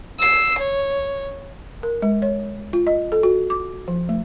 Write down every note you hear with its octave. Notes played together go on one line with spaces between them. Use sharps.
E6 C7
C#5
A#4
G#3
C#5
F4
D#5
A4
F#4
D6
F3
A3